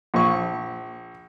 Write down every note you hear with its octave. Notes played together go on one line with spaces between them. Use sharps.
A#1 C#6